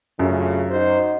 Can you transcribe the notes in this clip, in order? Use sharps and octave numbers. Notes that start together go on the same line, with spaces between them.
F#2 C#3 A3 D4 F4
D#4 F#4 C5